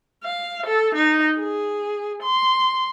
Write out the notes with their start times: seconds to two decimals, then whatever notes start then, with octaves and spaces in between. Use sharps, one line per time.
0.24 F5
0.66 A4
0.94 D#4
1.39 G#4
2.23 C6